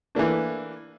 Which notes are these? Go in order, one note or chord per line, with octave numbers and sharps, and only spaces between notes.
E3 A3 A#3 D4